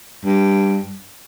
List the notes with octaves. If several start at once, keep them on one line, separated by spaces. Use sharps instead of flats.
G2